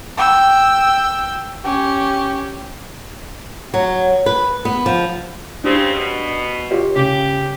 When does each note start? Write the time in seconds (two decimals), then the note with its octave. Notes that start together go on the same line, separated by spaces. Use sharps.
0.17 G5 E6
1.64 C#4 G4
3.74 F#3
4.26 B4
4.65 B3
4.86 F3
5.64 C#3 C4 D4 G4
5.92 B2
6.71 F4 G4 C#5
6.96 C#3 G4